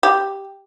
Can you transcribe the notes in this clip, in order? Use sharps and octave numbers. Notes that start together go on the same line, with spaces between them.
G4